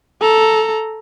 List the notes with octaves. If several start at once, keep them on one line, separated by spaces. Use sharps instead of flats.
A4 A#5